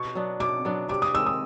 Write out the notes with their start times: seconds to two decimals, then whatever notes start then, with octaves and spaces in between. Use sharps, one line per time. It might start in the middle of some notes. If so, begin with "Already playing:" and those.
Already playing: B2 C#6
0.15 F#3 B3 D4
0.40 B2 D6
0.65 F#3 B3 D4
0.89 C3 D6
1.02 D#6
1.14 D#3 G#3 E6
1.26 D#6